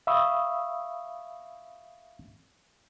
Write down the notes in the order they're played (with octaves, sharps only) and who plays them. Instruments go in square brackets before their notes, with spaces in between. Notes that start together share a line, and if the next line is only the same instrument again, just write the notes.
[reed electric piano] E5 F5 B5 C#6 D#6 E6